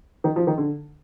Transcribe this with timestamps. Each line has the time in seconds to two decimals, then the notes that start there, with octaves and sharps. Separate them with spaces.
0.24 D#3
0.36 F3
0.47 D#3
0.58 D3